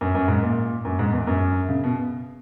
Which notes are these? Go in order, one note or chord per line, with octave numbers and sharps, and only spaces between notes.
F#2
F#2
G#2
A#2
F#2
G#2
E2
F#2
C#3
B2